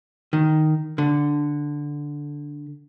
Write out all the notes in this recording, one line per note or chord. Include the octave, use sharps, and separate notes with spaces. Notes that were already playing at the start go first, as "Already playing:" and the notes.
D#3
D3